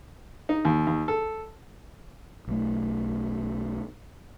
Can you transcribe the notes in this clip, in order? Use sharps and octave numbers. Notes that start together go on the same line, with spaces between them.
D#4
D#2
D#2
A4
B1 A3